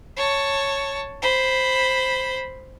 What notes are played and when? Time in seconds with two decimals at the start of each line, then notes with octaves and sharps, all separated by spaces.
0.16 C#5 A5
1.22 C5 B5